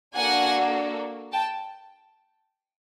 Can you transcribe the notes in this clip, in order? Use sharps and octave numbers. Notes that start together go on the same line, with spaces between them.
A#3 D4 F#4 A4 F#5 G#5
G5 A5